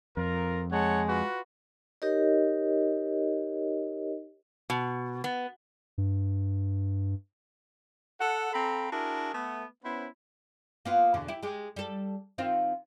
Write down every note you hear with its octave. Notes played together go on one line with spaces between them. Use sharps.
F2 F4 A#4
G#3 C#5 F#5 A5
F4 F#4 B4
D#4 G4 A#4 C#5 D#5
B2
B3
G2
A4 F#5
C4 A4 F5 A#5 B5
D4 E4 F#4 G#4 A#4
A3 B3
B3 C#4 E4 C5
A#3 B3 F4
E2 B2 D3
E4 G4
G#3 G4
G3 A4
D#3 C4 F4